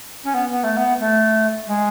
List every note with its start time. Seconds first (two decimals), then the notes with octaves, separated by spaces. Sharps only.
0.24 C#4
0.34 B3
0.50 B3
0.63 A3
0.76 B3
1.00 A3
1.67 G#3